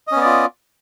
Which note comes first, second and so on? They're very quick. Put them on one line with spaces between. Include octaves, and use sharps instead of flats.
D#5 C#4 B3 D5 F4